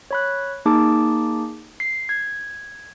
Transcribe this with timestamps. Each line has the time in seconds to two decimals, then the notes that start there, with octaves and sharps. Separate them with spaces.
0.11 C#5 B5 F#6
0.66 A#3 D#4 G#4 A5 D6
1.80 C7
2.09 G#6